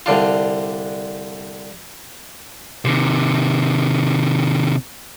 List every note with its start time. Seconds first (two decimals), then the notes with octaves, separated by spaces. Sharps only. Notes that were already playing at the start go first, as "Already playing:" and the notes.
0.06 C2 D3 D4 F4
2.85 C3 D#3